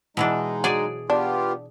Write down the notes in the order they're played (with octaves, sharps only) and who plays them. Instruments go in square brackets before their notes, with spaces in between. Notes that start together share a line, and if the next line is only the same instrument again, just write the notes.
[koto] B2 E3 D4 [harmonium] G#3 D#4
[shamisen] F#3 [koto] G#4 D5
[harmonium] B3 F4 G4 [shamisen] D4